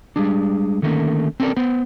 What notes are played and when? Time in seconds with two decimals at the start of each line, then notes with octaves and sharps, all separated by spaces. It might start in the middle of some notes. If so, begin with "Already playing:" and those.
0.16 G3 G#3 D4
0.82 D3 D#3 A3 A#3 C#4
1.40 C4 C#4 A4 A#4 D5
1.56 B3 C5